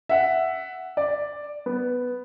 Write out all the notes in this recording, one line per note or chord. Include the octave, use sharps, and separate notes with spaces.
E5 F#5
D5
B3